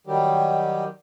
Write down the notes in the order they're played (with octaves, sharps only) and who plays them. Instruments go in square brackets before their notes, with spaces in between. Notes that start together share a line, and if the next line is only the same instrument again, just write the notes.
[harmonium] D#3 F#3 G3 G4